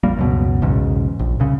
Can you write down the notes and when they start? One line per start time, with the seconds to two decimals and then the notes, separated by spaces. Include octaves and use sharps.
0.03 A#1 F2 G3 A#3
0.17 C#2 F#2 B2
0.62 B1 E2 G#2 C#3
1.19 A#1
1.40 C2 C#3